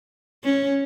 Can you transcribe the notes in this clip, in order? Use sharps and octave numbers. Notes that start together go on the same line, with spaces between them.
C#4